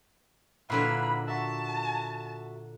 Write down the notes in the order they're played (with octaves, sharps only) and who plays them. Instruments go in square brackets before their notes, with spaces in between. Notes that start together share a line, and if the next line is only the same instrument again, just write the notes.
[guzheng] A#2 D3 F#3 [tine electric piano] E4 B4 F5 [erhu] B5
[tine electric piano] F#4 E5 [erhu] A5